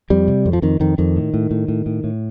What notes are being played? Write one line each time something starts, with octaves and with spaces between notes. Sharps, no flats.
F2 G3
C3
F2
F3
F2 D#3
F2 D#3
F2 D#3
A2
A2
A2
A2
A2
A2